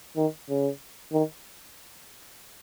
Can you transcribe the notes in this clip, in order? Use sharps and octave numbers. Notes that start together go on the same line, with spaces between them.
D#3
C#3
D#3